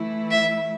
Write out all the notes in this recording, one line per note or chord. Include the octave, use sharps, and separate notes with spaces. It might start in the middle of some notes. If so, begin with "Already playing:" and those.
Already playing: E3 A3 E4
E5